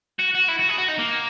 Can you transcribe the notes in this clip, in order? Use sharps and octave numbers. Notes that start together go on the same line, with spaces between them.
F#4
F#4
E4
F#4
G#4
F#4
D#4
A#3